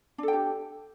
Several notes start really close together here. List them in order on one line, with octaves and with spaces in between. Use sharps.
D4 A4 G5 G4